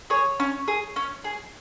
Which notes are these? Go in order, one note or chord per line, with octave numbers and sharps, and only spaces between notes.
G#4 C#5
C#4
G#4
C#4
G#4